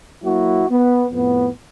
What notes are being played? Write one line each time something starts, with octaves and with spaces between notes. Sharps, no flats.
F#3 A#3 E4 F#4
B3
F2 A2 B3